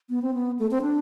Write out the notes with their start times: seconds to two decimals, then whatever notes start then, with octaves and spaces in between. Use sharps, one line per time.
0.09 B3
0.22 C4
0.34 B3
0.59 A3
0.71 C4
0.82 D4